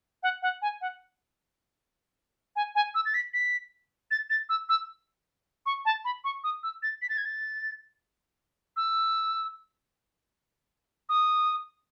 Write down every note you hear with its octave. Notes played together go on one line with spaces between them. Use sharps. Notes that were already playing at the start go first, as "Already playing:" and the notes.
F#5
F#5
G#5
F#5
G#5
G#5
E6
A6
B6
B6
A6
A6
E6
E6
C#6
A5
B5
C#6
D#6
E6
A6
B6
A6
G#6
A6
E6
D#6